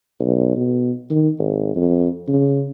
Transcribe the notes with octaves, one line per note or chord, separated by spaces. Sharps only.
B1
B2
D#3
G#1
F2
C#3